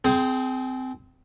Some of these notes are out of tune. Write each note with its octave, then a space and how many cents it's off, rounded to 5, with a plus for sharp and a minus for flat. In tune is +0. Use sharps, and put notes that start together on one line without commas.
C4 -20 G#4 +25 C5 +0